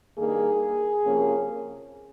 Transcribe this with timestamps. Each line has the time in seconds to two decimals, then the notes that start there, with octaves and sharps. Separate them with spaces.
0.17 G2 D#3 A#3 G#4
1.03 C3 F3 A#3 C#4